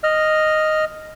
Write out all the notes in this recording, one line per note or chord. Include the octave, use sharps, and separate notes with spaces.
D#5 F6